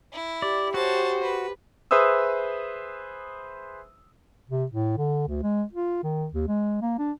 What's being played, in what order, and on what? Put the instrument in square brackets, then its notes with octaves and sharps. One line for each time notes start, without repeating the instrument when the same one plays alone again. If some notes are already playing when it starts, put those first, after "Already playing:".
[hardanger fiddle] E4
[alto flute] G4 [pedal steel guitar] D5
[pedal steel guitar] F#4 [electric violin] C5 [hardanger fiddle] C#5 A5
[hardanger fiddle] B4
[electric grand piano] G#4 B4 C5 E5 D#6 E6
[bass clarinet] C3
A2
D3
D2
G#3
F4
D#3
D#2
G#3
A#3
D4